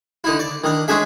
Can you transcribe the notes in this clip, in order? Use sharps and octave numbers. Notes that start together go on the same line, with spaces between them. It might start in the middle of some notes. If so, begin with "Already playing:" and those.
D3 D#4 E4
D5
D#3 D4
G#3 C#4 D4 G#4 E5